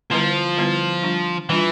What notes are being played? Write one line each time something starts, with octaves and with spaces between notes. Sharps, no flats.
D3 F3 G3 B3 E4 B4
D3 G3 B3 E4 B4
G3 D4 F4
E3 G3 D4 F4